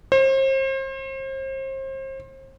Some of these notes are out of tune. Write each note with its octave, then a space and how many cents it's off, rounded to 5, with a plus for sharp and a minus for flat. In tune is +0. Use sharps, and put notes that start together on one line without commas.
C5 +35